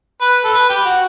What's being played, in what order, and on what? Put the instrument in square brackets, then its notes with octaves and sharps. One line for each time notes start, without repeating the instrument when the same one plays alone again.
[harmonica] B4
A4
B4
G4
F#4